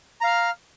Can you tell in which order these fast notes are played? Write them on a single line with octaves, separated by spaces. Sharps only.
A#5 F5 F6